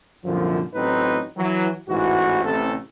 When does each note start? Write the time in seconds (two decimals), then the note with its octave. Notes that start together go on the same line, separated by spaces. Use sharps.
0.25 C2 F#2 A#2 D3 F3
0.75 A1 A2 F#3 C4 D#4 B4
1.37 E3 F#3
1.89 A1 G#2 E3 F#4
2.44 A1 C3 A4